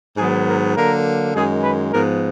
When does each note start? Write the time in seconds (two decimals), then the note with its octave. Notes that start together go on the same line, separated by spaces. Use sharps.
0.17 G#2 D#3 F#3 B3 G#4
0.47 A#4
0.75 D3 F#3 A#3 A#4
1.34 F#2 D#3 G#3 G#4
1.62 B4
1.92 G#2 F3 B3 A#4